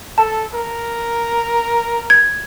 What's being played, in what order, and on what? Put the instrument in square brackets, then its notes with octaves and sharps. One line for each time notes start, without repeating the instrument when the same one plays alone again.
[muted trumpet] A4 [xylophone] A5
[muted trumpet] A#4
[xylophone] G#6